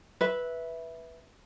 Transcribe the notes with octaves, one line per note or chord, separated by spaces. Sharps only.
B4 E5